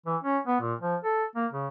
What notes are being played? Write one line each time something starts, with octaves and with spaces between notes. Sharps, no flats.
E3
C#4
B3
A#2
F3
A4
A#3
C#3